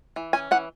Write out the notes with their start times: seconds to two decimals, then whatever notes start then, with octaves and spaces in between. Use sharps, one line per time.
0.16 E3
0.33 C#4 G#5
0.51 E3 F#5